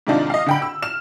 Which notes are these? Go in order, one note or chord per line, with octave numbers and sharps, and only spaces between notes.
G#2 C3 D#3 D4 D#4 F4
D#5 F5
D3 G5 B5
E6
F6 E7